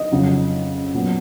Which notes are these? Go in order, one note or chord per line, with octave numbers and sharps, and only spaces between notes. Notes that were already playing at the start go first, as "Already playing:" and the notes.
Already playing: D#5
F2 C#3 F#3
A#2 F#3 B3